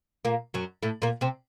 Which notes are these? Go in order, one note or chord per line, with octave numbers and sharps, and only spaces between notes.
A#2 A#3
F#2 F#3
A2 A3
A#2 A#3
C3 C4